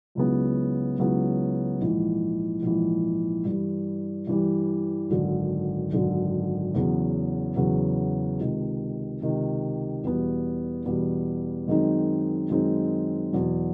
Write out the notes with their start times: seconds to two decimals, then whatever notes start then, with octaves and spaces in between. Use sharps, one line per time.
0.15 C#2 C#3 F#3 B3 E4
0.98 C#2 C#3 F#3 B3 E4
1.80 A#1 G#2 E3
2.62 A#1 G#2 E3
3.45 G2 E3 G3
4.27 G2 E3 G3
5.10 G#1 F#2 D3
5.92 G#1 F#2 D3
6.74 E2 C#3 F#3 B3
7.56 E2 C#3 F#3 B3
8.39 C#2 C3 D#3
9.21 C#2 C3 D#3
10.03 E2 B2 G3 B3
10.86 E2 B2 G3 B3
11.67 F#2 D#3 G#3 C4 D#4
12.50 F#2 D#3 G#3 C4 D#4
13.33 E2 B2 F#3